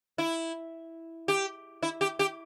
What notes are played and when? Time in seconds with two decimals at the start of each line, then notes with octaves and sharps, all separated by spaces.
0.18 E4
1.28 G4
1.83 E4
2.01 G4
2.19 G4